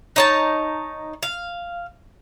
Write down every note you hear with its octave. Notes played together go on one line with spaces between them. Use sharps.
D#4 C#5 A5
F5